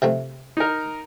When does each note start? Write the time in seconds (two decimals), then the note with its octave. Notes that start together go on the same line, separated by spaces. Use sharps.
0.02 C3 F3 A3
0.57 D#4 A#4